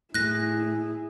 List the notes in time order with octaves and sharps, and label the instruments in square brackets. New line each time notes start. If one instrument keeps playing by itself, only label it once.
[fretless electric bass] A2 [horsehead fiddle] E4 G#4 [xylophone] F#6 A#6